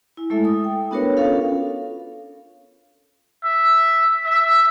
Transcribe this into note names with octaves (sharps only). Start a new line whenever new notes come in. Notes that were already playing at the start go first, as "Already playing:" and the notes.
E4 G#5
G#3 A3 E4 A4 E5
A4 D#6
G5
B3 D4 F#4 A#4 B4 C#5
C#4 F4 A4 F5
E5
E5